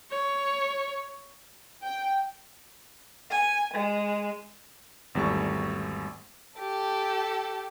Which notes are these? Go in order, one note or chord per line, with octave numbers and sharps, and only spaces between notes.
C#5
G5
G#5
G#3
G#1 E2 G3 A3 C#6
G4 A4